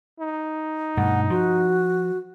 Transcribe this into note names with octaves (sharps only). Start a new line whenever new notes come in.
D#4
G2 B2 A3 F#5
F3 F#4